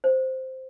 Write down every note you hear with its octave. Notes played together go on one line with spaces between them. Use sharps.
C5